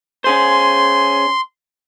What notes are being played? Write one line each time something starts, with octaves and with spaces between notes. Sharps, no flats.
C#4 G#4 C5 C6